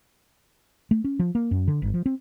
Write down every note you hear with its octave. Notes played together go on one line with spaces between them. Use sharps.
A3
C#4
F3
A#3
F#2
D3
G1
F3
C4